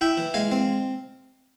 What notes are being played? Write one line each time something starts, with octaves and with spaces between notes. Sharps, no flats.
E4 E5 G5
E3
G#3 F5 G#5
C4